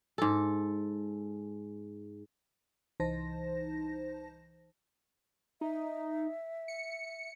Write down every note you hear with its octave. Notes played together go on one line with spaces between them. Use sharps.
G#2 A4
C2 E3 D#4 C5 A5 A#6
D#4 E5
C#7